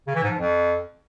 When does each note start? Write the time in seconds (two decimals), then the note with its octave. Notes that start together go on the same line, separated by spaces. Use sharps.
0.07 C#3
0.15 E3
0.22 G#2
0.30 F3
0.38 F2